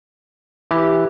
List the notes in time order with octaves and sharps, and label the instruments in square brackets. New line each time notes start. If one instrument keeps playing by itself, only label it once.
[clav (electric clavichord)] E3 [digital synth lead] G4